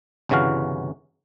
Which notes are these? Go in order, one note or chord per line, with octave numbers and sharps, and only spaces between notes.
G1 C2 C#3 E3 F#4 F5